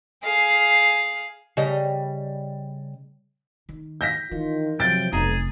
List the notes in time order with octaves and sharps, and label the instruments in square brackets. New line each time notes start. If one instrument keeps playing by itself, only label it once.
[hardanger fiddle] G#4 F5
[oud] C#3 G3 D#5
[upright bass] D#3
[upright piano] G6 A#6 B6
[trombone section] D#3 F4 [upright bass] E3
[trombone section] C3 F3 F#3 [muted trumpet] G5 [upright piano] A6
[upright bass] F1 [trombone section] B1 [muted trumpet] G#4 [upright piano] A#5